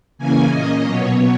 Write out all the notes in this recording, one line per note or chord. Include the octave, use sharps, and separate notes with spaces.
C#3 E3 A#3 C#4 G#5
A#2 A#3 C#4 D#5
B2 F#3 B3 C#5